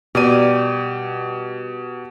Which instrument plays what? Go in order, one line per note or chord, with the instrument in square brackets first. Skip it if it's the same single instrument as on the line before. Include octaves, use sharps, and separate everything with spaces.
[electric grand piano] B2 D#7 [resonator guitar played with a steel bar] G3 A#4 D5 [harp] G4